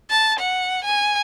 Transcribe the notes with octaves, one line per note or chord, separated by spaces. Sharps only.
A5
F#5
G#5